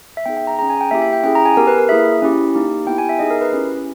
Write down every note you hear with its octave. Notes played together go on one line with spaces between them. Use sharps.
E5
B3 D#4 G#4 G5
G5
A#5
C#4 G#4 A#5
G#5
G5
A#3 E4 G4 E5
E5
G5
C#4 E4 G#4 G5
A#5
G#5
B3 G4 A#4
B4
A#4
A#3 E4 G#4 E5
C#4 E4 G4
A#3 D#4 G4
B3 E4 G4 G5
G#5
E5
B3 D#4 G#4 D#5
A#4
B4
C#4 E4 G4